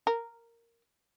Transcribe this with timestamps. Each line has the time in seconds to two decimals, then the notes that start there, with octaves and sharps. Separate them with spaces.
0.07 A#4